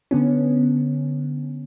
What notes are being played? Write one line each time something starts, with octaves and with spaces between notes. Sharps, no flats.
D3 B3 C#4